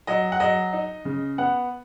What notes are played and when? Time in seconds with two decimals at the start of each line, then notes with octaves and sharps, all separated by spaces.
0.07 F#3 D#5
0.32 F#5
0.40 F#3 D#5
0.73 D#4
1.05 C#3
1.38 B3 F#5